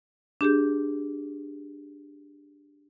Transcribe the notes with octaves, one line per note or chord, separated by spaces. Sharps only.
D4 G4 G#4 G6